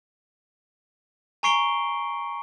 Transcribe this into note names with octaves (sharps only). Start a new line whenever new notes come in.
G#5 A#5 C#6 C7 D7 G7